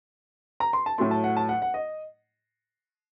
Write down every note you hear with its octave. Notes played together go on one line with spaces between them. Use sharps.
A#5
C6
A5
A2 F#3 A3 C6
A5
F#5
A5
F#5
F#5
D#5